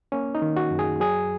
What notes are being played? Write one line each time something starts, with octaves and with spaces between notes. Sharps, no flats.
A#3 C#4
D#4
D#3
F#4
F#2
G#4
F#3 G#4